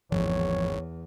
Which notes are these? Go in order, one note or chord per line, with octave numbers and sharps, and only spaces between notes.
G#1 E2 F3 C#5